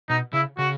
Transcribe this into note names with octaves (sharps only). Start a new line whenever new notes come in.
B2 D#4
C#3 E4
C#3 F#4